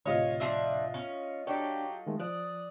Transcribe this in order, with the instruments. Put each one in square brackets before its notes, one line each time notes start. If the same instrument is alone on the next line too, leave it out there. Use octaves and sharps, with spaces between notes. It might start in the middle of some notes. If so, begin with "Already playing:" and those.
[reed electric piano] D2 A2 C3 [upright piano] F4 D#5 [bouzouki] C#5
[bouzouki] F3 D4 E5
C#4
[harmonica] F#3 G4 G5 [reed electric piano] D4 C#5 [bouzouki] A4
[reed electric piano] D#3 G#3 A3
[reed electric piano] F3 F#6 [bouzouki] D5 [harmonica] D#6